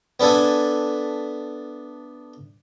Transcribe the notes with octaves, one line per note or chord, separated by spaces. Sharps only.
B3 D4 A4 E5 G#5